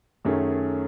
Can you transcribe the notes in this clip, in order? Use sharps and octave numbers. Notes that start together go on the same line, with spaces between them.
F#2 D#3 A3 C#4 G#4